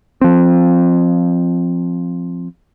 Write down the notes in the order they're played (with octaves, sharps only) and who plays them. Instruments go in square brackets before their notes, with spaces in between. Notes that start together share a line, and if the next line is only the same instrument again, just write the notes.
[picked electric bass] F3 C4